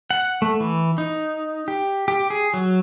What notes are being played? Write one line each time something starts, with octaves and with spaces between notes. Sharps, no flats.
F#5
A3
E3
D#4
G4
G4
G#4
F#3